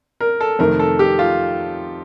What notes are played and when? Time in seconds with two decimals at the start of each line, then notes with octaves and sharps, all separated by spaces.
0.20 A#4
0.41 A4
0.59 F2 C3 D#3 A3 A#4
0.79 A4
0.99 G4
1.19 F4